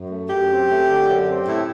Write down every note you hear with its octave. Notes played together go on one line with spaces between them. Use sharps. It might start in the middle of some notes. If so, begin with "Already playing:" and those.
Already playing: F#2
A3
F#2 G4
C4
A3
D3
F#2
C4
A2 E4